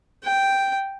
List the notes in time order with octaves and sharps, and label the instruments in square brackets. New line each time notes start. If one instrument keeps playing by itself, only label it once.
[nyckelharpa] G5